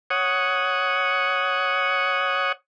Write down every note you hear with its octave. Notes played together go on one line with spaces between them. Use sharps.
C#5 F#5 D#6